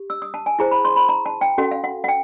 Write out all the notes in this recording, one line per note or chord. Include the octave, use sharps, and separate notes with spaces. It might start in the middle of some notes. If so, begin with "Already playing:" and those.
Already playing: G4
E6
D#6
A5
G#5
E4 G#4 C5 A#5
B5
C6
B5
A#5
A5
G5
C#4 F#4 A4 F#5
F5
F#5
F#5
G5